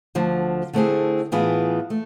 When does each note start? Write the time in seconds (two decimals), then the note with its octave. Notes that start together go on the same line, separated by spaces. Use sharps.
0.15 D2 D3 F3
0.73 D3 A3 C4 E4 G#4
1.32 A2 E3 B3 F4 G#4
1.90 A3